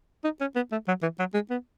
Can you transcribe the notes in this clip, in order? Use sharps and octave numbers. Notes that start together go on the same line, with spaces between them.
D#4
C#4
B3
A3
F#3
E3
F#3
G#3
B3